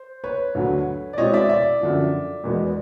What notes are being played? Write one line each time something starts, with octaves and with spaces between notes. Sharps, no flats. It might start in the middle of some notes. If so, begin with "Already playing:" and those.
Already playing: C5
B4 C#5
D2 D3 F#3
D5
B2 G#3 C4 E4 C#5 D#5
D5 E5
D5 E5
F#2 D3 F3
E2 B2 G#3 B3